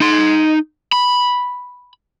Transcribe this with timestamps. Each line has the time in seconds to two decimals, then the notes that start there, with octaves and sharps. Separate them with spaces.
0.01 D#4 C6
0.92 B5